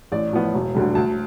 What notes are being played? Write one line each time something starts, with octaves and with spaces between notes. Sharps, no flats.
A1 D5
A2 F3 B3
E1
D2 D3 G3
D2 A5